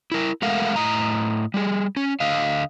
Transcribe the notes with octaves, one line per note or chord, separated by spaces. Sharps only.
E4 A#4
G#3 A3 A#4 F5 F#5
A2 D#5 A#5
G3 G#4
C#4
D3 D#5 F5